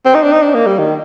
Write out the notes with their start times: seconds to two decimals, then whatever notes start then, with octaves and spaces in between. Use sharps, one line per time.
0.05 C4
0.14 D#4
0.23 D4
0.32 D#4
0.42 D4
0.54 A#3
0.66 G3
0.79 D#3